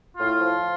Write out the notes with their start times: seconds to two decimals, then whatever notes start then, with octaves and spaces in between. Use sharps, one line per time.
0.18 A2 F4
0.40 F3